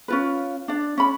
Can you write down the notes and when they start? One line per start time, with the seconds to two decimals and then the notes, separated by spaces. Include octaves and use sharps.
0.08 C#4 F4 B4
0.68 D4 D5
0.97 C#4 B5